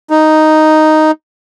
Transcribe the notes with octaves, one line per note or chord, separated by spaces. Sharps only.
D#4